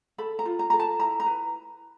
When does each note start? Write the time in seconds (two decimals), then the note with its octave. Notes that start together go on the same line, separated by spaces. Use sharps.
0.18 A4 B5
0.39 A#5
0.45 F4
0.59 A#5
0.70 A4 A#5
0.79 A5
1.00 E4 A#5
1.20 A#5
1.26 B4